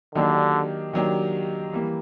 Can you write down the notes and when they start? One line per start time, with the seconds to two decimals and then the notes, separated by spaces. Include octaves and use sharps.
0.15 D3 D#3 F#3 A#3 D4 G4
0.93 D#3 F#3 A#3 D4 G4
1.73 E3 G3 A#3